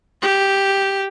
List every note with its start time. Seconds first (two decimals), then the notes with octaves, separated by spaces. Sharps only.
0.22 G4